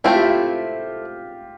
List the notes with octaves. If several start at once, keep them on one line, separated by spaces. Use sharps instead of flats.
A3 C4 E4 F4
G4
F4